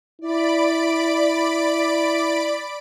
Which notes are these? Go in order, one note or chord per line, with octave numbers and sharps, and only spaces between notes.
E4 D5 B5 D7